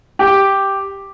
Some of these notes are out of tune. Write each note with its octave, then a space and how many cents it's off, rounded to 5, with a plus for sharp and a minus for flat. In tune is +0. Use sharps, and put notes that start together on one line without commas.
G4 +0